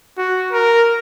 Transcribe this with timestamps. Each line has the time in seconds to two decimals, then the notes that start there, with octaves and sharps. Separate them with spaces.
0.18 F#4
0.52 A#4